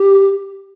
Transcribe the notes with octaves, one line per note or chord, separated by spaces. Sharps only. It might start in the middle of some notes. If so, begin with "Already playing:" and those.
Already playing: G4